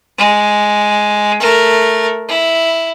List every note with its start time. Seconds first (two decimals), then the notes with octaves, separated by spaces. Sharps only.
0.18 G#3
1.40 A3 A#4
2.28 E4